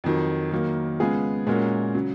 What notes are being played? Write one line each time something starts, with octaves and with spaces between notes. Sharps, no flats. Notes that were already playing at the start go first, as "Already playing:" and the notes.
F2 D#3 F#3
D#3 F#3 A#3
C#3 G#3 B3 F4 G#4
A#2 G#3 C#4 F#4 A#4
C#3 F#3